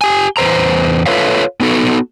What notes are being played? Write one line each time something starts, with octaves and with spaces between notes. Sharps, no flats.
G4 G#5
E2 B4 C5 A#5
F4 A4 B4 C#5 E5 F5
B3 D#4 F#4 A4